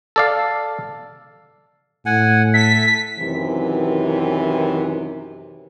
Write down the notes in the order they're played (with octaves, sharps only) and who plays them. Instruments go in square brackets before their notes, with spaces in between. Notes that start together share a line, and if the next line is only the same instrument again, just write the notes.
[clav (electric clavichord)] A4 D5 F5
[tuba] A2 [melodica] F#5 G#5
[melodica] A4 E5 [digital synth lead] B6
[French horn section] F#2 C3 D#3 E3